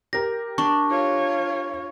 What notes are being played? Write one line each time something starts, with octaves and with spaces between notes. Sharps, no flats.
G4 A#4 A#6
D4 C#6
F4 C#5